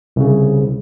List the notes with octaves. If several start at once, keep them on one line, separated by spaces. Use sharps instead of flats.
C2 C#3